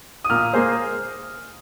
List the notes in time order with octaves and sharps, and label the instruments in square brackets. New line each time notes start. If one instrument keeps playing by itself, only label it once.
[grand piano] D#6
[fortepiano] A#2 [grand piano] F6
[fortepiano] A#3 G#4 C5